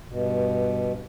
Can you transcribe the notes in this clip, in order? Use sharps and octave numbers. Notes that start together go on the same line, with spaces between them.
G2 B2